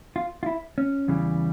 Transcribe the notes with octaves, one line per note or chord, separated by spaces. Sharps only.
F4
F4
E4
C#4
E2 C#3 E3 G3